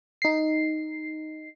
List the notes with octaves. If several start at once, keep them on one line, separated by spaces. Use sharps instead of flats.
D#4 C7